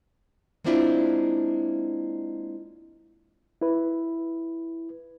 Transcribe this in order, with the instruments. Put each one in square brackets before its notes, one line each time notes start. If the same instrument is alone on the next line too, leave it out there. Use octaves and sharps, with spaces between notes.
[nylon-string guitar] G#3 A#3 C4 D4 E4 F4
[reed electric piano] E4 B4